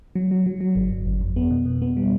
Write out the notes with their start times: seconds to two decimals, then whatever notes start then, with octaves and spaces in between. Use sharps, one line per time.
0.15 F#3
0.31 F#3
0.46 F#3
0.61 F#3
0.75 G1
0.91 G1
1.06 G1
1.21 F2
1.36 B3
1.51 B2
1.66 B2
1.82 B3
1.97 G3